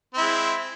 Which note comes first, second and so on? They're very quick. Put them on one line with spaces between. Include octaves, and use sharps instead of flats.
C4 E4 G#3